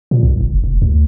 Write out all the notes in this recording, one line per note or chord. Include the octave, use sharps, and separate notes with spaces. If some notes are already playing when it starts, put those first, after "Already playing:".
A#2
C2
F#1
F1
D2